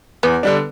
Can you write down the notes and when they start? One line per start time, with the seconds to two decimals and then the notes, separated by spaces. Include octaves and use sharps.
0.23 E2 B3
0.43 D3 G3 D4